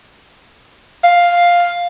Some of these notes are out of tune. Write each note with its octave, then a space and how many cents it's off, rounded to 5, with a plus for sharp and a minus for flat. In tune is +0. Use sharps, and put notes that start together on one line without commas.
F5 +5